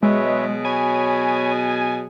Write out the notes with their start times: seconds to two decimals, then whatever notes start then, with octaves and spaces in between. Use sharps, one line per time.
0.03 B2 F#3 G#3 G#4 B4 C#5 E5
0.65 C#5 G#5 B5